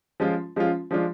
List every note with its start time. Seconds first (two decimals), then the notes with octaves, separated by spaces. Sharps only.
0.20 F3 G#3 C#4 F4
0.56 F3 G#3 C#4 F4
0.91 F3 G#3 D4 F4